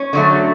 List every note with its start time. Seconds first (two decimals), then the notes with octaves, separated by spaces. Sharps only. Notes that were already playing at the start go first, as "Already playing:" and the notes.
Already playing: C#4
0.13 D3 F#3 A3